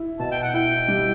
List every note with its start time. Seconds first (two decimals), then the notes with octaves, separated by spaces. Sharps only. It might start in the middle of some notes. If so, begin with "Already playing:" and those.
Already playing: E4
0.19 B2 A5
0.32 G5
0.43 F#5
0.54 E4 G5
0.88 G3